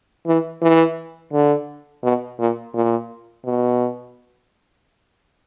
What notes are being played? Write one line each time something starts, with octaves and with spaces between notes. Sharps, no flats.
E3
E3
D3
B2
A#2
A#2
B2